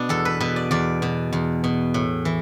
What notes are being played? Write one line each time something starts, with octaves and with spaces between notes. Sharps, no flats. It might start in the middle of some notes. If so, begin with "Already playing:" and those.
Already playing: B2 B3 D4
E2 A4
B4
B2 B4
D5
E2 D5
B2
E2
B2
A2
E3